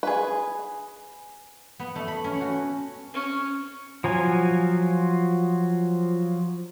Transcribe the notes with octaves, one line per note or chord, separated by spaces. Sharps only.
G#4 B4
B3
A3
B5
C#4
F#4
C#4
F3 F#3 G#5